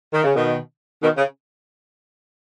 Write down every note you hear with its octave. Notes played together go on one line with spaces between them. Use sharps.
D#3
C#3
B2 D#3
B2 D#3
C#3